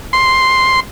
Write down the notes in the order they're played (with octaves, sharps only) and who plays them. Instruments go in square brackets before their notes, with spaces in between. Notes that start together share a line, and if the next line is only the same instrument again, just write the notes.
[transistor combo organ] C6